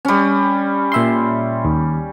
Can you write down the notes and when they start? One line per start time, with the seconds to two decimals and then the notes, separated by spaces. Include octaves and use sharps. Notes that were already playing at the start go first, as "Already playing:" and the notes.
0.05 G3 C#4
0.92 A#2 E5 C6
1.65 D#2